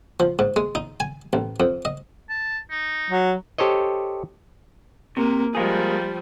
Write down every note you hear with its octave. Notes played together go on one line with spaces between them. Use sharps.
F3
G#2
G#3
D#4
G#5
A1
F2
D#5
A5
D#4
F#3
G4 A4 C5 C#5 D#5
C3 A#3
F3 G3 G#3 A#3 G#4